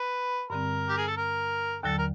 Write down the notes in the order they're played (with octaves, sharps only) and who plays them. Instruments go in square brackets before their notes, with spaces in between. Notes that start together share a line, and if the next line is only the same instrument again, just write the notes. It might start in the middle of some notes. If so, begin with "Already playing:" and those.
Already playing: [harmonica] B4
[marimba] G2 D3 G3 C4 [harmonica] A#4
[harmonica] G4
G#4
A4
A#4
[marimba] D#2 D3 F#3 [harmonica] A4
[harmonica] A#4